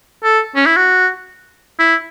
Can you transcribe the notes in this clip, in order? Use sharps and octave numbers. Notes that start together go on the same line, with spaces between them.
A4
C#4
E4
F#4
E4